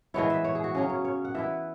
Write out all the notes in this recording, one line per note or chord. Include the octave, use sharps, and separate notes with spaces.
E3 G#3 B3 E4 C#5
E5
C#5
G#4
F#4
C#3 F#3 C#4 G#4
C#5
C#5
F#5
E3 B3 E4 E5